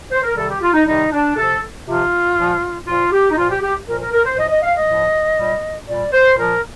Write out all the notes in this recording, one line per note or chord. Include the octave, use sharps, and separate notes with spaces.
C5
A#4
C3 D#3 G3 A4
G4
F4
D#4
C3 D#3 G3 D#4
D4
C3 F3 A4
C3 F3 F4
A#2 F3
A#2 F3 F4
G4
D#4
A#2 F3 F4
G4
G4
A#2 F3 A#4
A#4
A#4
C5
A2 F3 D#5
D#5
F5
D#5
A2 F3
A#2 G3
A#2 G3 D5
C5
A#2 F3 A#4